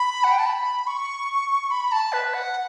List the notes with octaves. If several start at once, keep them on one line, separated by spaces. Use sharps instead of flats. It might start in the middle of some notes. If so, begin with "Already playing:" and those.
Already playing: B5
F#5
G5
A5
B5
C#6
B5
A5
B4
F#5